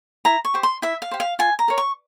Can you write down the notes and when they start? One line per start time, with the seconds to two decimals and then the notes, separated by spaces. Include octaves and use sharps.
0.25 E4 A#5
0.45 C#6
0.54 G4 C5
0.63 C6
0.82 E4 E5
1.02 F5
1.11 G4 C5
1.20 F5
1.39 F4 G#5
1.59 A#5
1.68 A#4 C#5
1.78 C#6